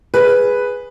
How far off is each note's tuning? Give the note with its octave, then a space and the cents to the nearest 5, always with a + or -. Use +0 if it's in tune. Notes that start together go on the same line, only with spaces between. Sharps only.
G#4 -5 B4 +0